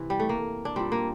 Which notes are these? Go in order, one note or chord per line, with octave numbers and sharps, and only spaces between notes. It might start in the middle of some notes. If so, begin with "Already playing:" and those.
Already playing: C3 E3
G3
A3
A#3
D4
A#2 G3 C4
A#3